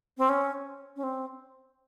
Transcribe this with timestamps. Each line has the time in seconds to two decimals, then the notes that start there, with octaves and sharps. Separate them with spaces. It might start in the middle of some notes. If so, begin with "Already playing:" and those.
0.18 C4
0.29 C#4
0.96 C#4
1.03 C4